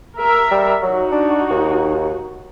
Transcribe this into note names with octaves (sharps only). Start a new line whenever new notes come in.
A#4 E5
G3
F#3 D#4 F#4
D4
D#2